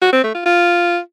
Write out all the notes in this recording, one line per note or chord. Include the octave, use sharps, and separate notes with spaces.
F#4
C4
A3
F4
F4